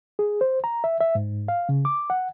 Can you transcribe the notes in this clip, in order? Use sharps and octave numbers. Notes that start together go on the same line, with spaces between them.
G#4
C5
A#5
E5
E5
G#2
F5
C#3
D6
F#5